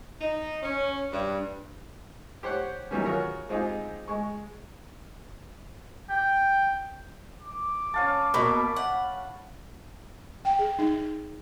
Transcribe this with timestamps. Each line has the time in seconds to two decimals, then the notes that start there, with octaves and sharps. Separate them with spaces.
0.21 D#4
0.63 C#4
1.13 G2
2.43 G4 C5 C#5 F#5
2.91 D#3 E3 F#3 G3 B3 C#4
3.05 F4 F#4 G#4 A#4 C#5
3.49 G#3 C4 D#4 F4 G4 G#4
4.08 G#3 C#6
6.10 G5
7.42 D6
7.94 C#4 F5 A5
8.34 B2 A#3 B5
8.76 F#5
10.45 G5
10.59 G#4
10.79 D#4